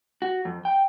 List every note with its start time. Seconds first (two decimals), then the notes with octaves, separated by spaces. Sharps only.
0.22 F#4
0.45 F2
0.65 G5